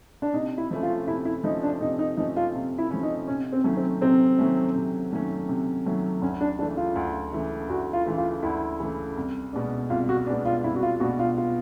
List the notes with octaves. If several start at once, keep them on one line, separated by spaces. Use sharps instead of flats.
D4
C3 D#4
E4
F3 A3 C#4
F4
C3 E4
E4
F3 A3 C#4 D#4
D4
C3 D#4
D#4
F3 A3 C#4 D#4
F4
C3
E4
F3 A3 C#4
D#4
C3 C#4
C4
D#3 F#3 A3 C#4
C4
C3 C4
D#3 F#3 A3 C#4
C3
D#3 F#3 A3 C#4
C3
D#3 F#3 A3 C#4
D2 C#4
D4
C#3 E3 A3 D4
F4
D2
C#3 E3 A3
D2 F#4
F4
C#3 E3 A3
F4
D2 E4
C#3 E3 A3
C2
B2 G#3 B3 D4
C2 F4
F#4
B2 G#3 B3 D4
F4
C2 E4
F#4
F4
B2 G#3 B3 D4 F#4
F4
F4